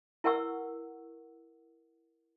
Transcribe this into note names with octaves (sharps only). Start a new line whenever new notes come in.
E4 A#4 B4 F#5 C#6 E6